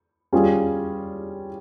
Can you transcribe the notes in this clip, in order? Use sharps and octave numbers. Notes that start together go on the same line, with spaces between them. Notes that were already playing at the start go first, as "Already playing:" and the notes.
G3 C#4 F4 G#4